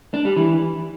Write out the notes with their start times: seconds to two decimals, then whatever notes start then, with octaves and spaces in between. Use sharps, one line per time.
0.14 D4
0.25 G3
0.37 E3